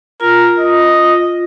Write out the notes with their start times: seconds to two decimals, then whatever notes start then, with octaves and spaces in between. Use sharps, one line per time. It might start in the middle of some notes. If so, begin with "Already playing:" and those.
0.21 F4 A#4
0.59 D#5